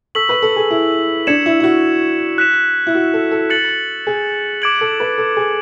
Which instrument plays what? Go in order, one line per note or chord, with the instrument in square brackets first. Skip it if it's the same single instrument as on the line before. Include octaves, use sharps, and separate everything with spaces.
[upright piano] A4 [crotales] C#6 E6 B6 F#7
[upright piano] B4
A4
G#4
E4
[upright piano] D4 [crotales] G#6 C#7 E7
[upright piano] E4
E4
F#4
[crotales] F#6 B6 E7
[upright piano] E4
F#4
A4
A4
[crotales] F#6 A6 C#7 F#7
[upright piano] G#4
[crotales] D6 G#6 D7 F#7
[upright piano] A4
B4
A4
G#4